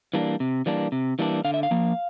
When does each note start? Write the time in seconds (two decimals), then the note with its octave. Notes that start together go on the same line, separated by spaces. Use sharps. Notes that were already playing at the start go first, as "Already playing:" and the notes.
0.14 E3 G3 A#3 D4
0.40 C3
0.66 E3 G3 A#3 D4
0.92 C3
1.19 E3 G3 A#3 D4
1.45 D3 F5
1.54 E5
1.63 F5
1.71 F3 A#3